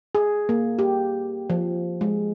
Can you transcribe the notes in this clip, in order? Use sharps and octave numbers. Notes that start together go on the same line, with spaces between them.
G#4
A#3
G4
F3
G#3